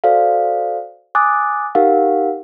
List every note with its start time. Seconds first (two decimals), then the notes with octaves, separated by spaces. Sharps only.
0.04 F#4 A4 C5 D5 F5
1.15 G#5 D6 D#6 F#6 A6
1.75 D#4 G4 A#4 F5 F#5